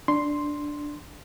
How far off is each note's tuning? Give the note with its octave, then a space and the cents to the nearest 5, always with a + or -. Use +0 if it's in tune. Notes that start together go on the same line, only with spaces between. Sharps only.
D4 +0 C6 +0